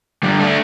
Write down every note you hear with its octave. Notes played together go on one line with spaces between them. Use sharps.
D3 G3
A3 D4